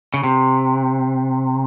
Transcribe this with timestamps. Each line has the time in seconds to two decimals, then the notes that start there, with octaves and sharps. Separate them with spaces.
0.14 C#3
0.23 C3